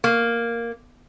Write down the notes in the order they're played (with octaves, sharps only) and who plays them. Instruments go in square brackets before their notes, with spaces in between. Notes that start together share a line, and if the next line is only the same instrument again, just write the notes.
[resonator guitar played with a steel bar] A#3